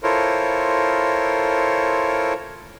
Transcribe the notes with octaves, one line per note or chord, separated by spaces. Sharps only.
E4 F4 A4 A#4 C5 C#5